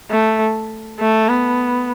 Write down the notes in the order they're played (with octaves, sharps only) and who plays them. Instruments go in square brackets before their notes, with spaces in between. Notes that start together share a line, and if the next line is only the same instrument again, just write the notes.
[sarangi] A3
A3
B3